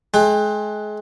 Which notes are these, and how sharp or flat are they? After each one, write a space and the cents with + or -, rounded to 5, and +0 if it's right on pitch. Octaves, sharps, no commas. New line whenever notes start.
G#3 +30 G5 +40